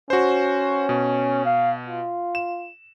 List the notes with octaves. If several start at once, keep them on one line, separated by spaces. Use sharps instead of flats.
C#4 F#4 C5
B2
F5
F4
E7